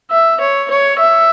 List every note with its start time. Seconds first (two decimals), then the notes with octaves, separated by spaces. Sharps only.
0.11 E5
0.41 C#5
0.71 C#5
0.99 E5